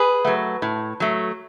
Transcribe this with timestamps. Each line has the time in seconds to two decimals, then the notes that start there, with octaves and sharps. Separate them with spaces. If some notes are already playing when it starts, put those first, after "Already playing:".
Already playing: G#4 B4
0.25 F#3 A3
0.62 A2
1.00 F#3 A3